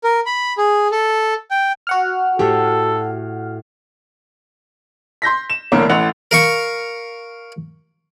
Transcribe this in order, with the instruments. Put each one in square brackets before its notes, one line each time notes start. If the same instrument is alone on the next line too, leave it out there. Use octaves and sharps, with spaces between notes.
[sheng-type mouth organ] A#4
B5
G#4
A4
G5
[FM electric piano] F#4 F#5 F6
[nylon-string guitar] A2 A3 G4 [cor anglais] A4
[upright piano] C6 G6 A#6 B6
E7
E1 C2 D3 A3 A#3 C#5
A1 A2 F#5 F7
[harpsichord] A#4 F5 C#6